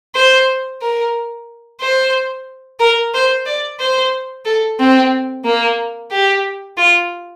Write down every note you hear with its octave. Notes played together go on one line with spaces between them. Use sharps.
C5
A#4
C5
A#4
C5
D5
C5
A4
C4
A#3
G4
F4